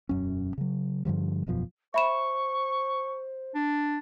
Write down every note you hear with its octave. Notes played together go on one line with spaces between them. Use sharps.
E1 F#2 C#4
C#3 F#3
G2 D3 F3 G3
E1 F#2 B2 F3
C5 E5 B5 C#6 E7
D4